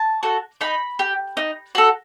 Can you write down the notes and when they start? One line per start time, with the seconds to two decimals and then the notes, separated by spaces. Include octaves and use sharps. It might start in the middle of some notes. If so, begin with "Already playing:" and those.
Already playing: A5
0.23 F#4 A4
0.61 D#4 B5
0.99 G4
1.37 D#4
1.75 F#4 A4